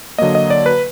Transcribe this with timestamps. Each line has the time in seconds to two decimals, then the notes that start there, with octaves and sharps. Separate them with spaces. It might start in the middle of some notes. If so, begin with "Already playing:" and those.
0.18 D3 F#3 A#3 D#5
0.35 D#5
0.50 D5
0.66 B4